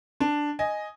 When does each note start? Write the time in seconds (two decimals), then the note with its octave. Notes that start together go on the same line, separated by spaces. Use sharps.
0.20 D4
0.59 D#5 G#5